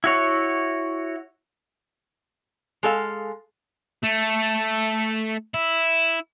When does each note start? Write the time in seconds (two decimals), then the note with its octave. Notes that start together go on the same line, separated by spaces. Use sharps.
0.04 E4 F#4 C#5
2.83 G#3 A4 F5
4.04 A3
5.54 E4